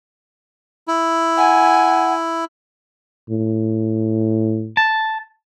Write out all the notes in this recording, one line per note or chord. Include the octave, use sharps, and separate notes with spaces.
E4
F#5 G#5
A2
A5